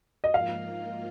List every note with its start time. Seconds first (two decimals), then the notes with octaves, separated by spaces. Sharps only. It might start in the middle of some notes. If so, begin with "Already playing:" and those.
0.24 D#5
0.34 G#2 F3 A#3 F4 A#4 F5